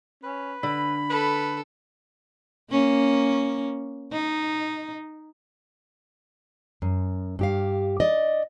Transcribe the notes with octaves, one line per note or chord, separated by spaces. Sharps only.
C#4 B4
D3 B5
A4 B4
A#3 C#4
D#4
F#2
G2 G4 F5
D5 D#5